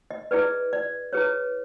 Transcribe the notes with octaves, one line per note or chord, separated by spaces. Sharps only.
D#5
E4 G#4 B4 D5
D5
E4 G#4 B4 C#5